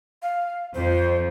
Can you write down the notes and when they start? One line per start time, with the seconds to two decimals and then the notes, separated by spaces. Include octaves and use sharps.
0.22 F5
0.75 F2 C5